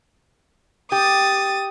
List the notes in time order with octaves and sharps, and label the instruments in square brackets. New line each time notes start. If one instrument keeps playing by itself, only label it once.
[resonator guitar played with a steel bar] G4 [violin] D#6 A6